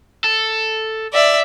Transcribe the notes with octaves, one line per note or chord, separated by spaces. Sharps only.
A4
D5 E5